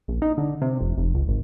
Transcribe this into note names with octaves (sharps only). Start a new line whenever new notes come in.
A#1
D#4
D3
C3
F1
F1
C#2
G#1